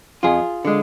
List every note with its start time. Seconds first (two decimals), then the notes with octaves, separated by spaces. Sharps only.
0.23 F2 F4 G#4
0.65 D3 G#3